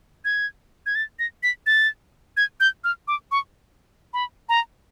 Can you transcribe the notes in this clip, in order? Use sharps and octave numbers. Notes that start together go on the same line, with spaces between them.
G#6
G#6
A6
A#6
B6
A6
G#6
G6
F6
D6
C#6
B5
A#5